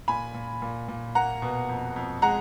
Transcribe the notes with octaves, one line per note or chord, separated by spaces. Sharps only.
A#2 G#5 B5
A#2
A#2
A#2
A#3 F#5 A#5
B2
F2
F2
G#3 F#5 A#5